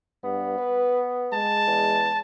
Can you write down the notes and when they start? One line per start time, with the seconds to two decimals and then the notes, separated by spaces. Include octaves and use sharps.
0.24 G2 B3
0.58 B4
1.33 G#3 A5
1.67 E2